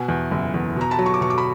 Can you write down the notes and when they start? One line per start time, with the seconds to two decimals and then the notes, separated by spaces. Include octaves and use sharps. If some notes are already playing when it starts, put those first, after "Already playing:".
Already playing: B2 F#5 G#5
0.08 E2
0.31 F#1
0.54 E2
0.76 B2 A#5
0.91 A5 B5
0.99 F#3
1.06 C#6
1.14 D6
1.21 B2 C#6
1.30 D6
1.38 B5 C#6